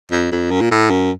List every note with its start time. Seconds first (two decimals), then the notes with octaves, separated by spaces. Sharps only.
0.11 F2
0.32 F2
0.51 F#2
0.61 A#2
0.71 A2
0.90 F#2